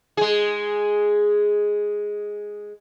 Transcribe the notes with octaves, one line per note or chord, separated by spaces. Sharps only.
G#3 G#4